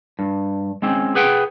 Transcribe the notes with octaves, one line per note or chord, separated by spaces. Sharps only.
G2
G#3 C4 C#4
G#4 B4 F#5 G5